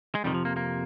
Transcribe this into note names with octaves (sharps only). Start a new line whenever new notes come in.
G#3
F2 C3 D#3 G3
F3
A#3
A#3